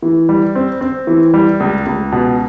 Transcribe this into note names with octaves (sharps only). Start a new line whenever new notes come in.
E3
G3
C4
C4
E3
G3
C#2
C#2
B2